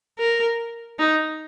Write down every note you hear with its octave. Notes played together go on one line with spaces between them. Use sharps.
A#4
D#4